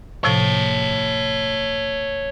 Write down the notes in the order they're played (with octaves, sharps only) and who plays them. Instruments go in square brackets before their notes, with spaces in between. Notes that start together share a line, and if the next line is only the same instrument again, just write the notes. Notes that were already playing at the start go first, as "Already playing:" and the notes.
[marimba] A2 C3 F3 [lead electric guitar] C#5 A5